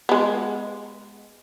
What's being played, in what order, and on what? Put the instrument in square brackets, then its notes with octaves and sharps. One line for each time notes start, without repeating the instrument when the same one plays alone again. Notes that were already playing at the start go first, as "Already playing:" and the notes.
[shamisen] G#3 B3